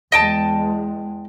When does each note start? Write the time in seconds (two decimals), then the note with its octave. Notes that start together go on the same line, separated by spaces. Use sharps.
0.12 E2 G#3 D#5 G5 A5